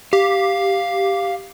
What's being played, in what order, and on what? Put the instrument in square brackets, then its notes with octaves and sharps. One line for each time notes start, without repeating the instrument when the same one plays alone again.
[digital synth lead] G4 [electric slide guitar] F5